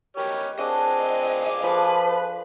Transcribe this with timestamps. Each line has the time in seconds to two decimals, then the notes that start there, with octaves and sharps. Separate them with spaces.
0.17 F#4 G4 A#4 B4 C#5 D#5 F6
0.59 C4 D4 G#4 D#5 F5 D6
1.64 F3 A4 B4 C5 B5